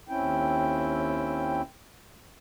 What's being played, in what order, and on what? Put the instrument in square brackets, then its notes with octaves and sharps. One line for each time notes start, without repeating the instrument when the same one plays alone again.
[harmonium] D#2 C4 C#4 E4 G5